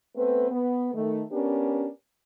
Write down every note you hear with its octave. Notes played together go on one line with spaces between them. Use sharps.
A3 B3 C4 B4
B3
D#3 A3
B3 C#4 D4 G4 A#4